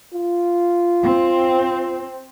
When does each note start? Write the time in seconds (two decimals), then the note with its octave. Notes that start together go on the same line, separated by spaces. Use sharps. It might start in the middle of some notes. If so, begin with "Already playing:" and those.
0.14 F4
1.02 C4